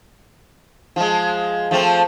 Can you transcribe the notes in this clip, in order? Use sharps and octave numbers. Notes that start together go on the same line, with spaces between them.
F3 G#3
F3 A3 C4